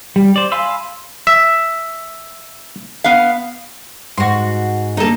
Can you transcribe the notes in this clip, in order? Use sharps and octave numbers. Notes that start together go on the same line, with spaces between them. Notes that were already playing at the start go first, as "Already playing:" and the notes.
G3
C5 D5
F5 G#5 B5 C6 E6
E5
B3 F5
G#2 F#4 C6
D3 A#3 D#4 A4